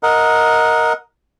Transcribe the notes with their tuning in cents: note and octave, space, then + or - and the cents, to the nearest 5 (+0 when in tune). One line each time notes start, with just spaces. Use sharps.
A#4 +0 D#5 +15 F#5 -20